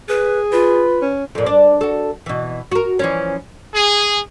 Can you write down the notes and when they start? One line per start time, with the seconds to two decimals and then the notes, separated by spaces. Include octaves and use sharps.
0.09 G#4 B4
0.52 F4 B4
1.02 C#4
1.35 F2 A#2
1.46 D4
1.81 F#4 A4
2.26 B2 E3
2.72 F#4 A#4
2.99 E3 F3 C#4
3.74 G#4